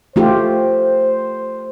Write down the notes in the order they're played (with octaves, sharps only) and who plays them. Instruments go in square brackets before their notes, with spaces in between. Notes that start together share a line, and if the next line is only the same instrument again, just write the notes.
[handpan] A3 F4 G4 [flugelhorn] C5